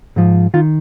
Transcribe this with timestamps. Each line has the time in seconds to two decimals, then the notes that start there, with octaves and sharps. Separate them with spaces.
0.16 G#2 F3
0.54 D#3 F4